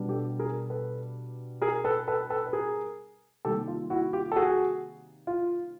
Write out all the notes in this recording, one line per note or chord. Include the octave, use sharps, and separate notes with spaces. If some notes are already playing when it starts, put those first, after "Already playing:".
Already playing: B2 G3 B3 D4
G4 A4
G#4 A#4
A4 B4
G#4 A#4
A4 B4
A4 B4
A4 B4
B4
G#4 A#4
C3 D#3 G3 A#3 G4 A4
F4
E4 F#4
F4 G4
A4
F#4 G#4
F4